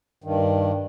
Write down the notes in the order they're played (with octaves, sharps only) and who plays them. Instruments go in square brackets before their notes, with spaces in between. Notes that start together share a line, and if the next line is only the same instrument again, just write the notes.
[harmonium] G2 D#3